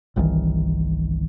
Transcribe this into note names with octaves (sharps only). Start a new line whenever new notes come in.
G1 C2 D#3 E3